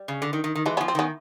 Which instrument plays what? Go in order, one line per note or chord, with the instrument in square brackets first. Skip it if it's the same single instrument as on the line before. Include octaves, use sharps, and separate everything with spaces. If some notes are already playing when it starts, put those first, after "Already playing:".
Already playing: [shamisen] G3
[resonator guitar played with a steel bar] C#3
D3
D#3
D#3
D#3
[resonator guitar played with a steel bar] E3 [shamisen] G#3
[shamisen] B3 C#4
[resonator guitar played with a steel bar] F3
[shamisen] C4
[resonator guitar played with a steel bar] D#3 [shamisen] B3 C#4